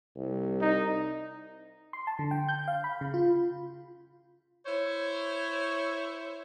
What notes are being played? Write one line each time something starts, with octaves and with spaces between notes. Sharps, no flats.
C2
D#4
C6
A5
D3
G5
G6
F5
B5
C#3
F4
E4 C5 C#5